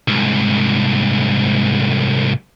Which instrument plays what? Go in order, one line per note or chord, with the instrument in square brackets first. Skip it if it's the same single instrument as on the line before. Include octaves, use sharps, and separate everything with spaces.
[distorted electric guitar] C2 G#2